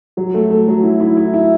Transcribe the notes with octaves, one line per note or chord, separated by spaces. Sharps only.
F#3
A3
A3
F#3
E4
E4
E4
E4